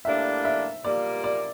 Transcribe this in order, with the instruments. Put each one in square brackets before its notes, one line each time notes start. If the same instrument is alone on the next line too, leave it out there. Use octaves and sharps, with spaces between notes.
[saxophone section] A2 G3 A#3 D4 [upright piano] E5
[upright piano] E5
[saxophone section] A#2 G3 A#3 [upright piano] D5
[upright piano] D5